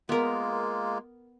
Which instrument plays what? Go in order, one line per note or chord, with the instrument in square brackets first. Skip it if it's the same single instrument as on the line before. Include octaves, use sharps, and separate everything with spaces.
[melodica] G#3 A#3 F4 [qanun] B3 A#4